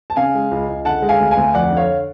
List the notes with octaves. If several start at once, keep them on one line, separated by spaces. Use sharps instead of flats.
A5
C#3 F5 G#5
G#3
C#2
C#2
D3 F#5 A5
G#3
F5 G#5
D2
F5 G#5
D2
F2 D5 F#5
D3 C#5 F5